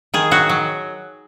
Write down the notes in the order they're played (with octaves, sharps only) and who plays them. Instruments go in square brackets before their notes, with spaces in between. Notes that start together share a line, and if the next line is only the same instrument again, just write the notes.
[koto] D#3 G#4
F#3 F#4
F#3